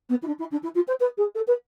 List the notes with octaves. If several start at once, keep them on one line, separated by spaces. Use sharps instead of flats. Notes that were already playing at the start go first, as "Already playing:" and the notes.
B3
E4
D4
E4
D4
E4
F4
C5
B4
G#4
A4
B4